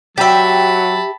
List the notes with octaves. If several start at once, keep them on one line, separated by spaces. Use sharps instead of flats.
F#3 G4 E5 A5 B5